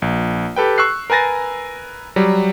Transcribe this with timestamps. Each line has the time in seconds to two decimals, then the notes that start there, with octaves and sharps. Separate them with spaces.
0.02 A#1
0.56 G4 A4 B4 G5
0.78 C#6 E6 F#6 C7
1.10 A#4 B4 G#5 A6 A#6
2.16 F#3 G3